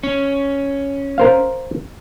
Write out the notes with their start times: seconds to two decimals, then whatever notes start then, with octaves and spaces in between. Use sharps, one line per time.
0.03 C#4
1.18 A#4 C5 F5